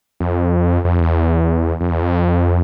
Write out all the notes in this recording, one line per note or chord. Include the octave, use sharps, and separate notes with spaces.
F2
F2
E2
F2
E2
F2